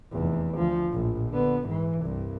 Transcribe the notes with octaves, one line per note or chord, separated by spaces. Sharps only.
F1 E2
D2 F3
A#1 A2
D3 B3
G#2 E3
C2 G2